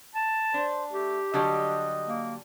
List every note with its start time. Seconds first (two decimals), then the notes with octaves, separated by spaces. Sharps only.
0.15 A5
0.54 D4 C5
0.92 A3 G4
1.34 D3 F#3 G3 D#5
2.07 A#3